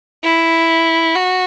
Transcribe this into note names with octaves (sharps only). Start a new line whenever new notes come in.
E4
F#4